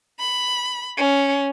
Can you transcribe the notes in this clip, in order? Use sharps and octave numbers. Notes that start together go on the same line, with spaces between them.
B5
C#4